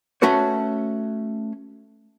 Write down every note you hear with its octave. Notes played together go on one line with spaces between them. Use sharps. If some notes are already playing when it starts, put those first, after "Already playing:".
A3 C#4 F#4 B4 C#5